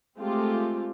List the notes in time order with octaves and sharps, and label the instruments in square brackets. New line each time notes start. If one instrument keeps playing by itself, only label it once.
[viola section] G#3 A3 C4 F4 G4